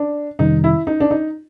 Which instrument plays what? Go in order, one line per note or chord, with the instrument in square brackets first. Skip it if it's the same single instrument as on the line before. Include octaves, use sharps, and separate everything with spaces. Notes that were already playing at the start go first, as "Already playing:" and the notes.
Already playing: [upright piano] D4
[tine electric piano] F2 C3 D#3 G3 [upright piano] D#4
[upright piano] E4
D#4
D4
D#4